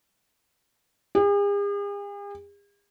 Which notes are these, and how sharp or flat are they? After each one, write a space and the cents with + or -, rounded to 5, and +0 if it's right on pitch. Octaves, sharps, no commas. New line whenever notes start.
G#4 -45